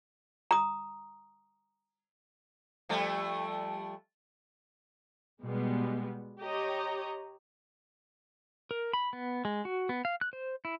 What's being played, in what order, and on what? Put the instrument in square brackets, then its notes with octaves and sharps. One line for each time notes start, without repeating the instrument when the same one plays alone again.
[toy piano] A#5 D#6
[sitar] F3 G3 A3
[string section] B2 G3 G#3 B3
G4 C#5 D#5 A#5
[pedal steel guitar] A#4
B5
B3
G#3
F#4
B3
F5
F#6
C5
E4